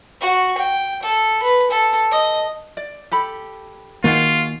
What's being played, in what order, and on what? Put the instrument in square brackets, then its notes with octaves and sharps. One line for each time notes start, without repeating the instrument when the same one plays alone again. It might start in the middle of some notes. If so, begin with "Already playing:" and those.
[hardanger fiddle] F#4
G5
A4
B4
A4
D#5
[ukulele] D5
G4 A4 B5
[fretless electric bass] D#3 A#3 [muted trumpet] F4 [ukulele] F#4 G#4 F#5